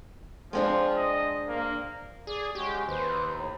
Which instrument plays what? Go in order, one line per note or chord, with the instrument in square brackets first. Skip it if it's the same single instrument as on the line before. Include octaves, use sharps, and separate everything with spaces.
[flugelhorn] F3 [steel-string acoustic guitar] G#3 C4 D4
[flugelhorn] D#5
A#3
[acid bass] G#4 [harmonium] D5
[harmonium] G#3 C#4 F#4 [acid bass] G4
[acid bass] D#2 [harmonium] B4 C5
[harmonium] A2